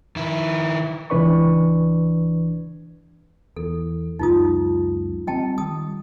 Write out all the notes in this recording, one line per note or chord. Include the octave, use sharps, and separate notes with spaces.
D#3 E4
C#2 E3 D4 B4 D5 C#6
E2 A4
C#2 F#2 D#4 F4 D#6
G3 C4 D#5 G5 A5
D#3 G3 D#6